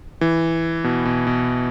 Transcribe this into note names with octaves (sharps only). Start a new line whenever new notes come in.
E3
B2
B2
B2